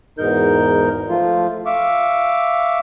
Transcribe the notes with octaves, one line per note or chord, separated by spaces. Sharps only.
E2 G#2 B2 D#4 A#4 G6
F3 A3 F4
E5 F5 C#6 D6